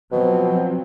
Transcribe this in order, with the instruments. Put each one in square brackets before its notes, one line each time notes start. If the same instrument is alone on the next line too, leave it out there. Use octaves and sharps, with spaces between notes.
[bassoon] B2 [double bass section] F3 F#3 C4